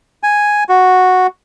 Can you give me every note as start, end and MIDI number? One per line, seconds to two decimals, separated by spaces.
0.23 0.64 80
0.69 1.27 66